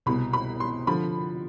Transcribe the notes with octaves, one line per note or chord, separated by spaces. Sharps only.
C2 B2 B3 B5
B5
C6
D3 F3 B5